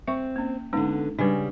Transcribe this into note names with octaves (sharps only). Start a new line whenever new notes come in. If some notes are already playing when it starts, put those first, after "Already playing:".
C4 E5 C#6
A#3 C#4
D3 G#3 B3 C#4 D#4
C#3 G3 D4 B4